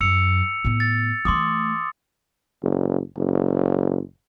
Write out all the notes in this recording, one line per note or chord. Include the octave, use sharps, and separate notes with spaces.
F#2 E6 C#7 F7
A2 B3
A6
E3 A3 C6 D6 D#6
F#1
F#1